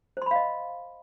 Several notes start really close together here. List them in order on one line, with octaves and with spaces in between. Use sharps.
C5 C6 B5 F5 D#5